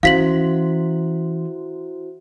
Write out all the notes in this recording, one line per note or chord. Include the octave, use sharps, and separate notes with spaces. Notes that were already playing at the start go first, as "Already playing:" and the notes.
E3 C#4 E4 F#4 C5 F5 B6 F#7